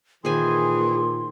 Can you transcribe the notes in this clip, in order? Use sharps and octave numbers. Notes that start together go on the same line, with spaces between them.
A#2 D#3 E3 G#4 C5 G#5 C6